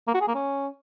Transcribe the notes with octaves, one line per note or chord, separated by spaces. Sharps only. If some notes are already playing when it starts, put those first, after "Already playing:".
A#3
F#4
G#4
A#3
C#4